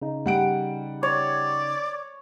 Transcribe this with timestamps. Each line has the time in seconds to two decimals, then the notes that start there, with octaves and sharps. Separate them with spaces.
0.02 C#3 D#4
0.26 G3 F#5 D7
1.03 C#5 D5